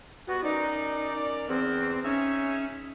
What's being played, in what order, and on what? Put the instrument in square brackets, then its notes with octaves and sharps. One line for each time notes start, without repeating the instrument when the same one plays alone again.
[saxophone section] G3 B3 [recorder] F#4
[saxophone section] F#2 A#4 D5 [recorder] D#4
[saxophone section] E2 [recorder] C4
[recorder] C#4 [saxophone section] D#4 G#4 E5